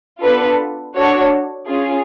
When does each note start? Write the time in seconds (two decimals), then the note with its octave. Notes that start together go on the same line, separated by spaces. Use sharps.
0.22 B3 D4 F4 A4 B4
0.95 D4 F#4 A4 C#5
1.68 C#4 F4 G#4